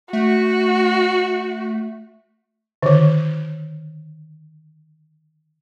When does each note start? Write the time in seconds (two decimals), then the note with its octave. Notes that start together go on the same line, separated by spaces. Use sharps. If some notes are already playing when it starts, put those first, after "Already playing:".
0.13 A3 F#4
2.83 D3 D#3